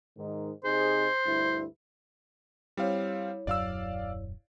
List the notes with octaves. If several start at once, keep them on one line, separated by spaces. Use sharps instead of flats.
G#2 D#3
C3 D#4 G#4 C5
D2 G2 E4
G3 C4 E4 C#5 F5
D#1 F#2 F#3 D5 F5 E6